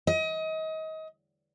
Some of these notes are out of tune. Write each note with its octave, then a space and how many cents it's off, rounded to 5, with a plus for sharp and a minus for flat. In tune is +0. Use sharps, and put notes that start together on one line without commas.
D#5 +30